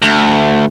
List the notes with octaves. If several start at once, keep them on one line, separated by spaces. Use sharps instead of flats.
D2